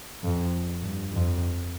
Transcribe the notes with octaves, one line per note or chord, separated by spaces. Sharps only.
F2
G2
F2